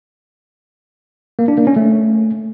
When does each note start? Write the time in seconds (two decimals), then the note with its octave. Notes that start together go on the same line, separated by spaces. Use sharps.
1.39 A#3
1.48 D4
1.58 A#3
1.67 C#4
1.76 A3